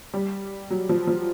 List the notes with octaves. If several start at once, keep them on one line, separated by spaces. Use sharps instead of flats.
G3
F#3
F3
F3